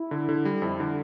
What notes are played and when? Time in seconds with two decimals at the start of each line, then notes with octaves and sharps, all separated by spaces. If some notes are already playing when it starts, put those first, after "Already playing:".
Already playing: E4
0.11 D3
0.29 D3
0.45 G3
0.62 F2 E4
0.80 D3